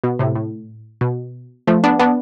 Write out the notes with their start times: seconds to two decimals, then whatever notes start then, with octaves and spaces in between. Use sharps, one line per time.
0.04 B2
0.19 A2 C3
0.36 A2
1.01 B2
1.67 F3 A3
1.84 B3 D4
1.99 B3 D4